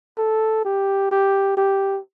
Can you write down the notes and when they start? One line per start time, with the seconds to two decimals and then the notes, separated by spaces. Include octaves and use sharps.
0.18 A4
0.65 G4
1.11 G4
1.57 G4